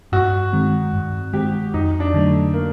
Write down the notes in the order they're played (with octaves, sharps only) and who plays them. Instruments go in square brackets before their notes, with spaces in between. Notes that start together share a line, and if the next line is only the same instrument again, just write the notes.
[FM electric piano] G2 [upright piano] F#4
[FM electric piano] D#3 G#3 C4
G2
[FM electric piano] D#3 G#3 C4 [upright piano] G4
[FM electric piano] F2 [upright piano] D#4
[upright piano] D4
[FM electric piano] D3 F#3 A3
[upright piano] A#3